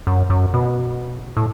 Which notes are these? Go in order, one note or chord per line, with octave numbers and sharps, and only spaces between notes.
F#2
F#2
B2
A2